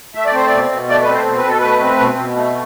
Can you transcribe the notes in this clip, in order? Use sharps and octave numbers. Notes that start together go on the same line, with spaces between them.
A3 E5
D5
C4 C5
D5
B2
B2
A3 D5
C4 B4
C5
B2
B4
B2 A4
A3 B4
C4
B2
B2
A3